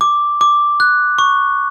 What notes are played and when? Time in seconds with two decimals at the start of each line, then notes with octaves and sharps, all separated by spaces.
0.01 D6
0.41 D6
0.80 F#6
1.18 C#6